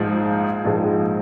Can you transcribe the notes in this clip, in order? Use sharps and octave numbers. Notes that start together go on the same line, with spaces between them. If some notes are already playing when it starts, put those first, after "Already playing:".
Already playing: A#1 G#2 F3 G#3 G#4
A#1 G#2 F3 G#3